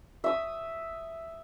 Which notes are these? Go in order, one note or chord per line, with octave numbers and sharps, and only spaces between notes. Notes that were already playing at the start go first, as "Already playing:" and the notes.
E5 D#6